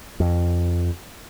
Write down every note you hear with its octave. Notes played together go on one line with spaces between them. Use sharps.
F2